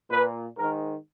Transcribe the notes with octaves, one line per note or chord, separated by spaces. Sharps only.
A#2 B4
G#2 D#3 A#4